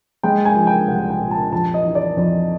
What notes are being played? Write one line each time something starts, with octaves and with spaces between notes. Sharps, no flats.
G#3 G5
G#5
F3
G5
C2 F#5
G5
A#2
A5
F2 A5
D#5
E3
D5
F2